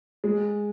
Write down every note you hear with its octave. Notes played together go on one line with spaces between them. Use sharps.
G#3